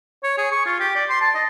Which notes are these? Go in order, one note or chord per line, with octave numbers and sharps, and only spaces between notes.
C#5
G#4
C#6
F4
G4
D5
C6
A5
D#5